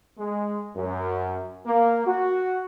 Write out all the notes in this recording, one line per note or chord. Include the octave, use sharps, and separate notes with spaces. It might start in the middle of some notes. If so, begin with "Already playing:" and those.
G#3
F#2
A#3
F#4